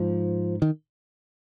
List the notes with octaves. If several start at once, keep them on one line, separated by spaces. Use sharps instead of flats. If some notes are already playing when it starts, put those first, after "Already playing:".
Already playing: G#2 F3
D#3